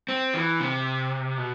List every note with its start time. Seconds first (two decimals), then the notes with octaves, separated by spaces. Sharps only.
0.09 C4
0.34 E3
0.60 C3
1.38 B2